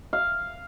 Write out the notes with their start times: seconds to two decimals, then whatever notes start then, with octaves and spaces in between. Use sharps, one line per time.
0.13 F5